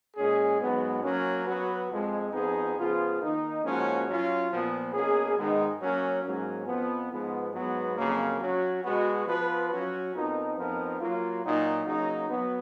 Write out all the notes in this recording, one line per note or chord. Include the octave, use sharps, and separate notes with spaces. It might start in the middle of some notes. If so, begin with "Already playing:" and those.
A#2 G#3 C#4 G#4
G#2 F#3 B3
F#3 A#3 C#4
F#3 B3 F#4 B4
F2 F3 G#3
F2 F3 B3 D#4 G#4
C#3 F3 B3 F4 G#4
D#3 A#3 D#4
G#2 F3 A#3 C#4 F#4
F#3 C#4 F4
A#2 F3 B3
B2 A#3 C#4 G#4
G#2 D#3 G#3 B3 D#4
F#3 A#3 C#4
G#2 F#3 A#3 C#4
F2 F3 B3
G#2 F3 B3
G#2 F#3 B3
F2 C#3 F#3 A#3
F#3 C#4 F#4
B2 G#3 B3 F#4
F3 B3 F4 B4
F#3 C#4 F#4
F2 F3 B3 D#4 A#4
F2 F3 B3 D#4 A#4
F#3 A#3 F4
A#2 F#3 A#3 D#4
C#3 F#3 A#3 D#4
F#3 B3